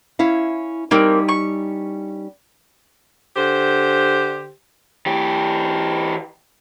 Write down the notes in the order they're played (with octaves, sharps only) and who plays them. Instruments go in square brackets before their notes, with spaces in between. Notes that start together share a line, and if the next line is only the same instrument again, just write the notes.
[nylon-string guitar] C#4 E4 F5
[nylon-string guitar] G3 C#4 D#4 [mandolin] A#3 C4
[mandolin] C#6
[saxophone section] D3 G4 C5
[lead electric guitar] E3 G4